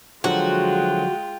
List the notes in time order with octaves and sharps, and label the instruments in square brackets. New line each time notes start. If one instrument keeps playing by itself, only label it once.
[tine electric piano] D3 F3 F#3 [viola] G#3 [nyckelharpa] F4 G5 [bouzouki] F#4